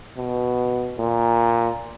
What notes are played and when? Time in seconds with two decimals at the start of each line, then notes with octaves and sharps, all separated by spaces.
0.17 B2
0.98 A#2